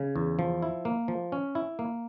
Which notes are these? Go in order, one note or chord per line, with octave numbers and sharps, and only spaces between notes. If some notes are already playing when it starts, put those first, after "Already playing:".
Already playing: C#3
E2
F3
E4
A#3
F3
C#4
E4
A#3